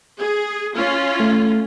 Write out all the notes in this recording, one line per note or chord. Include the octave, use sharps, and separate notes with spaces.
G#4
C#4 F4
A3